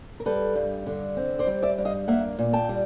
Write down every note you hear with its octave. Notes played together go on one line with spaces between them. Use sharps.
A#4
G3 A4 B4
G2
D3
C4
C5 D5
G3
D5 E5
G2
D#5 F5
A#3 E5 F#5
A#2
G5 A5
G3